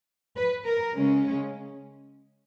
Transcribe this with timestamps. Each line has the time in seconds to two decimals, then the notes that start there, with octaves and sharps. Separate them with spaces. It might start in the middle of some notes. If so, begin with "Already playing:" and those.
0.36 B4
0.65 A#4
0.92 C#3 G#3 C#4